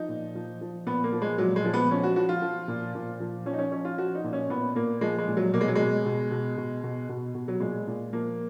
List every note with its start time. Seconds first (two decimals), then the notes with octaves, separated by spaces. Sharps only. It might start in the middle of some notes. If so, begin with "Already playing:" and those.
Already playing: F3 D#4
0.09 A#2
0.35 F3
0.61 F3
0.86 A#2 B3
1.04 A#3
1.13 F3
1.22 G#3
1.38 A#2 F#3
1.56 G#3
1.65 F3
1.74 B3
1.91 F3 C#4
2.03 F#4
2.16 F3 F#4
2.29 F4
2.42 F3
2.68 A#2
2.95 A#2
3.20 F3
3.46 F3 C#4
3.53 D#4
3.59 C#4
3.71 F3 C#4
3.85 F4
3.98 F3 F#4
4.15 D#4
4.24 A#2
4.33 C#4
4.49 A#2 B3
4.75 A#2 A#3
5.01 F3 G#3
5.18 G#3
5.28 A#2
5.37 F#3
5.54 B2 A#3
5.61 G#3
5.68 F#3
5.75 B2 G#3
6.06 B2
6.31 B2
6.57 B2
6.84 B2
7.09 B2
7.35 B2
7.48 F#3
7.60 A#2 G#3
7.87 A#2
8.13 F3 A#3